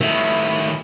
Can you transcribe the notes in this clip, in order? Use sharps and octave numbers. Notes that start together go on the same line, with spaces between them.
A2 D#3 E4